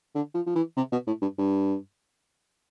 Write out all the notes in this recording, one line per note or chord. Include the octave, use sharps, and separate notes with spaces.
D3
F3
F3
E3
C3
B2
A2
G2
G2